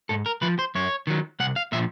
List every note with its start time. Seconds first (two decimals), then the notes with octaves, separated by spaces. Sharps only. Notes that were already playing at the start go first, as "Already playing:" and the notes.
0.09 G#2 A4
0.26 A#4
0.42 F3 B4
0.59 C5
0.75 F#2 C#5
1.07 D#3 F#3
1.40 C2 F#5
1.56 F5
1.72 A#2 F3 E5